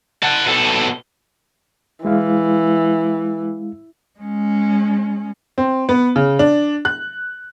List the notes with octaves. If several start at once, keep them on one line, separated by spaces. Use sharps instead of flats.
F#5 A5
B2 A4
E3 G#3 E4 F5
G#3 C#4
C4
B3
C#3
D4
F#6